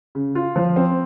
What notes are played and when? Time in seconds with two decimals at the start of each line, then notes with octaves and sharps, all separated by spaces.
0.15 C#3
0.35 F4
0.56 F3
0.76 C4